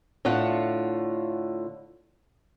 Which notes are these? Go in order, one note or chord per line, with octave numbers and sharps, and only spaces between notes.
A2 D3 F4 F#5